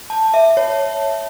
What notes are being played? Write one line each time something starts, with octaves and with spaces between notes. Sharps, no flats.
A5
E5
C#5